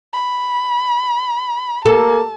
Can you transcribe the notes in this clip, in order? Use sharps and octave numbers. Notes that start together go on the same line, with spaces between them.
B5
A#3 A4 A5